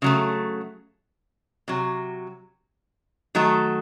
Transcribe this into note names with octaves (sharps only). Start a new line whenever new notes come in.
C#3 F#3 A3
C3 F#3
D#3 F#3 A3